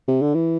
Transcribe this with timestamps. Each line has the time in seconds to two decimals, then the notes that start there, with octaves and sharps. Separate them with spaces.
0.08 C3
0.22 D3
0.35 E3